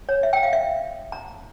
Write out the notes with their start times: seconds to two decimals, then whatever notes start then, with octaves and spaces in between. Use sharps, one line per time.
0.09 C#5
0.23 E5
0.33 G5
0.43 F5
0.53 E5
1.12 A#5